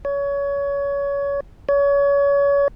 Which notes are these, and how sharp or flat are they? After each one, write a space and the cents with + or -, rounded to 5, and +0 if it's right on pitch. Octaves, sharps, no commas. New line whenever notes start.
C#5 +25
C#5 +30